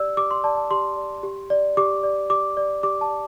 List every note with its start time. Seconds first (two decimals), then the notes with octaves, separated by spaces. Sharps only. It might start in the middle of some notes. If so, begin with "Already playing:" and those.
Already playing: G4 D5 E6
0.17 G4 D6
0.31 C6
0.44 D5 A5
0.57 A5
0.71 G4 C6
0.97 D5
1.23 G4
1.50 D5
1.77 G4 D6
2.03 D5
2.30 G4 D6
2.57 D5
2.83 G4 D6
3.01 A5
3.10 D5